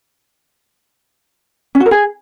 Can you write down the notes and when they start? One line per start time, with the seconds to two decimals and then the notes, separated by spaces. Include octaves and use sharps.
1.75 C#4
1.80 F#4
1.86 A#4
1.91 G#4